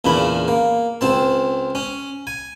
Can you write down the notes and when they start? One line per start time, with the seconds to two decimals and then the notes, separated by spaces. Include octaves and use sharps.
0.05 E2 A#2 C#3 D4 B5
0.48 A#3
1.01 C#2 C4 A5
1.75 C#4
2.27 G#5